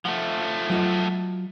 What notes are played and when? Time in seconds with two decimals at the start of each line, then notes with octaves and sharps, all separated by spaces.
0.05 F3 A3 F#5
0.70 F#3 F4 D#5